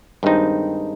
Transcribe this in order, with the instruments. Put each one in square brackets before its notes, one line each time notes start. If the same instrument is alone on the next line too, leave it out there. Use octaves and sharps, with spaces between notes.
[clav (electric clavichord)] G2 D#3 G#3 C4 D#4